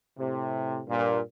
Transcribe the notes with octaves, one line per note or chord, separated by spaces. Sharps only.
A2 C3
G2 A#2